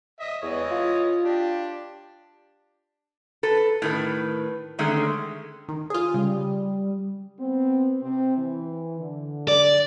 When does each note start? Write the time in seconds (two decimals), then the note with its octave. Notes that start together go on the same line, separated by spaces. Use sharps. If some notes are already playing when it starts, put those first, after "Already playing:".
0.20 D#5 E5
0.42 E2 E3 C#5 D#5
0.71 F4
1.23 D4 G4
3.43 A4 B4
3.82 A2 D#3 B4
4.79 D3 D#3 G#3 A3 C#4
5.69 D#3
5.90 F4 G#4 D#6
6.14 C#3 G3
7.39 B3 C4
8.00 C3 C4
8.38 E3
9.00 D3
9.48 D5